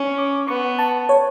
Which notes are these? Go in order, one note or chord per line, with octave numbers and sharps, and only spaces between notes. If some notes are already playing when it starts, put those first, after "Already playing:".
Already playing: C#4
D6
B3 C#6
A5
C#5